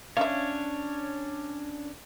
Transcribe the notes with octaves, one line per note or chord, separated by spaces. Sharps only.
C#4 D4 C#5 E5 F5